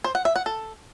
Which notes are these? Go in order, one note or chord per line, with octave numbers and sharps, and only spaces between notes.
C5
F#5
E5
F#5
A4